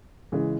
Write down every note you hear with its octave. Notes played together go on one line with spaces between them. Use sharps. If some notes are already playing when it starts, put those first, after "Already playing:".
C#3 E3 G#3